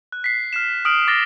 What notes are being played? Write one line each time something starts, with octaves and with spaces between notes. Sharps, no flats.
F#6
B6 C7
F6 C7 E7
D#6 F6 D7 F#7
D6 A6 A#6 G7